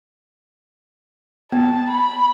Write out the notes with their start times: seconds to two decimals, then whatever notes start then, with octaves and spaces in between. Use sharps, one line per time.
1.52 B3 A5
1.90 B5